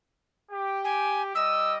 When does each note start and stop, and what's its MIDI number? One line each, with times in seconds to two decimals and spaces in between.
0.52 1.34 67
0.85 1.22 80
1.35 1.78 55
1.35 1.78 75
1.35 1.73 88